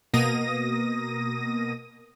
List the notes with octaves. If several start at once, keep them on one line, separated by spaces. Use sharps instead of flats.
B2 A#3 D#6 A#6 D#7